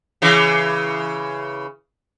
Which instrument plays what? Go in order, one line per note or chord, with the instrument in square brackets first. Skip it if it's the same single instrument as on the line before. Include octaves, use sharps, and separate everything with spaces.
[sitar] C#3 E3